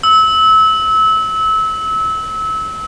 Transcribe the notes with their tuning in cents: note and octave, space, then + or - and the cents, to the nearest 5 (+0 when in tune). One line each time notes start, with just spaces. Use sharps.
E6 -25